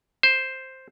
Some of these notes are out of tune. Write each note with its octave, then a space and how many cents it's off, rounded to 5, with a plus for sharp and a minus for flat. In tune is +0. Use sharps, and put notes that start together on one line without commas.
C5 +5